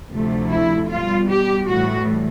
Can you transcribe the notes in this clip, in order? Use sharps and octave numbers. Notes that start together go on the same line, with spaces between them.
D2 C3 F3 A3
E4
B2 G3 F4
G4
A2 E3 G3 F#4